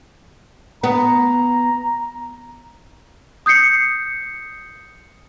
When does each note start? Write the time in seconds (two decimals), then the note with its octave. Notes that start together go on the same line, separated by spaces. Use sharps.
0.83 B3 A#5
3.46 D#6 G6 C7 C#7